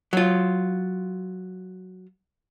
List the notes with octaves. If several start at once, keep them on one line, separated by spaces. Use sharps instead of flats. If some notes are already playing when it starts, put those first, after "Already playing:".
F#3 F4